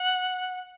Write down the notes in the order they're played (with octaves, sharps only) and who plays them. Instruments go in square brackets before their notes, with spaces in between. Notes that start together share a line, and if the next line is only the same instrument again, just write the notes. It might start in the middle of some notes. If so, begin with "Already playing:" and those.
Already playing: [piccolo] F#5